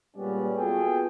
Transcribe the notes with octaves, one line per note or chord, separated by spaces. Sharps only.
A#2 G3 G#3 B3 C#4 D5
B3 F4 F#4 G#4 A4 G5